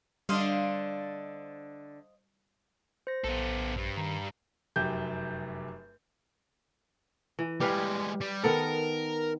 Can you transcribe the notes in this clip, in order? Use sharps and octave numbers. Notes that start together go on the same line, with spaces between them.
D3 G3 D4 C5 D#5 F5
C5 A#6
A#1 B3 A4
G2 G3
D#3 A#5
F1 F#2 G4 G6
E3
G3 G#3 G4 B4 F5
G3
D#3 B3 A4 A#4